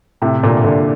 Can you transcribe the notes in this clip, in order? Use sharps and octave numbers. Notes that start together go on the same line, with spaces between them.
A2 C3
A#2 D3
A#2 D3